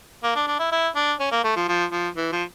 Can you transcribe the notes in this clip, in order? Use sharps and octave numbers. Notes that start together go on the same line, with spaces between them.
A#3
D4
D4
E4
E4
D4
C#4
A#3
A3
F3
F3
F3
E3
F3